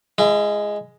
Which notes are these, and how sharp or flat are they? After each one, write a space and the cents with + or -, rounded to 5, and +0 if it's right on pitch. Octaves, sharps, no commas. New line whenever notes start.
G#3 +0 E4 +45